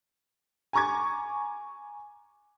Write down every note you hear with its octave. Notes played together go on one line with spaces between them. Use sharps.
G#5 A#5 C#6 D6 G#6